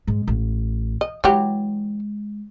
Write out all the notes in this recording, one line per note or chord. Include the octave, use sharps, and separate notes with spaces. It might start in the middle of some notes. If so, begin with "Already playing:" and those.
G#2 G#3
A1
D#5
E3 F#3 G#3 G4